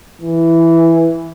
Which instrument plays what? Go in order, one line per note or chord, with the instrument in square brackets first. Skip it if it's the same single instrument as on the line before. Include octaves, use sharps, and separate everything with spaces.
[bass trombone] E3